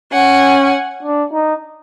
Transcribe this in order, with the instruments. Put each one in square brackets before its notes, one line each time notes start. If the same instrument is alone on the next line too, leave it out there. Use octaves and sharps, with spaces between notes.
[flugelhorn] C#4 [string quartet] F#5 G#5
[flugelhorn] D4
D#4